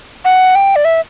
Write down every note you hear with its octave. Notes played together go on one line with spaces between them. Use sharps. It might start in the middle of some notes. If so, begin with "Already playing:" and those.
F#5
G5
D5
E5